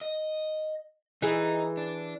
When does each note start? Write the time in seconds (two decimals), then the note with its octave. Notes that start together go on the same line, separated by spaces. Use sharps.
0.01 D#5
1.22 E3 D#4 G#4
1.77 D4